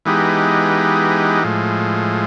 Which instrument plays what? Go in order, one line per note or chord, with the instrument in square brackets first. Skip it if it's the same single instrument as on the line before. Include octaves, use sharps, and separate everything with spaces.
[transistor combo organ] E3 G#3 B3 D#4 G4
A2 F3 G#3